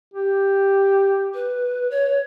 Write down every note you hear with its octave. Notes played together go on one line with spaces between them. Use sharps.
G4
B4
C#5